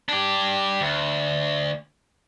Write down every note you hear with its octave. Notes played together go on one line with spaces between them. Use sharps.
D4 G4
D2